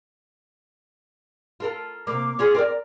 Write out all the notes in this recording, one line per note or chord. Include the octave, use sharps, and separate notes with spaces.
F4 A4 A#4
C3 A#3 D6
C#4 F4 G#4
C4 A#4 D5